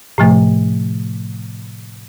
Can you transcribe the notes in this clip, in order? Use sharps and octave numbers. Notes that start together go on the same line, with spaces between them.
A2 C3 F3 A3